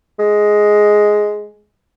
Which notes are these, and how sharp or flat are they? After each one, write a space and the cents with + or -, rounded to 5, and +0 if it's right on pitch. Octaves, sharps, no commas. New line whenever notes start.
G#3 +5